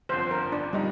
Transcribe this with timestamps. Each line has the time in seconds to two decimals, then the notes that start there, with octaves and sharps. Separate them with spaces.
0.09 G1 F2 D3 C5
0.31 A#4
0.52 D4
0.73 A#2 G3 G#3 D#4